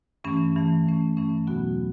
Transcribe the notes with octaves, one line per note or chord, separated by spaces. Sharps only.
G2 E3 A3 C#4
G2 E3 A3 C#4
G2 E3 A3 C#4
G2 E3 A3 C#4
E2 B2 F#3 B3 F#4